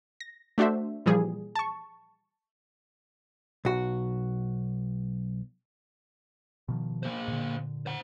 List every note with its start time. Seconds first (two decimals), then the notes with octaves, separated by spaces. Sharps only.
0.20 A#6
0.58 A3 D4 F#4 C5 E5
1.06 A#2 E3 F3 G3 G#4
1.55 A5 C#6
3.65 B1 F#4
6.68 B2 D#3 F3
7.03 A#3 C5
7.28 A#2 D3
7.86 C5 F#5